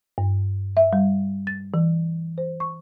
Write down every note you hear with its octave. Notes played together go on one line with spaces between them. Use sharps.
G2
E5
G3
A6
E3
C5
C#6